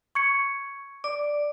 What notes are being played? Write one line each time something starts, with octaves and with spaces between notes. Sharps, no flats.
C#6 G#6 C#7
D5 D6